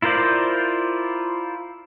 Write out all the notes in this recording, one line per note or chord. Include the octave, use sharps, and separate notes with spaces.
E4 F4 A#4 C5 D5